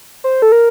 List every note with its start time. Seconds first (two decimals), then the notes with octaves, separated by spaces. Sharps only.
0.24 C5
0.42 A4
0.52 A#4